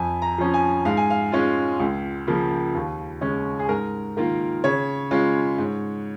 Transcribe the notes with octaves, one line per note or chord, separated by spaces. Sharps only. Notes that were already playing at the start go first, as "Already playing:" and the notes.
Already playing: F2 G#5
A#5
F3 C#4
G#5
G#2 F5
G#5
F5
G#3 C#4 F4
C#2
C#3 F3 A#3
D#2
C#3 G#3 C#4
G#4
G#2 A#4
D#3 A#3 F4
C#3 C#5
G#3 C#4 F4
G#2